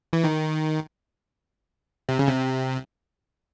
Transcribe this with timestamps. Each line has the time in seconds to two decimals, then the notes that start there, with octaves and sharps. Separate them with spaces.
0.13 E3
0.24 D#3
2.09 C3
2.19 C#3
2.28 C3